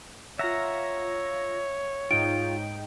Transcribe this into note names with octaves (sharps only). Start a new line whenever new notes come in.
F4 C#5 E5 F#5 A#5 A#6
G#2 D#4 F4 G5 D7